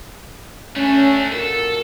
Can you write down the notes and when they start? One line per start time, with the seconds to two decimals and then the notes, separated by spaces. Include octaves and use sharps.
0.76 A3 C#4 D4
1.32 A#2 F#4 A4 A#4